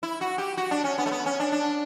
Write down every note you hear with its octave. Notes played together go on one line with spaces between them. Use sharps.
E4
F#4
G4
F#4
D4
C#4
B3
A3
B3
C#4
D4
D4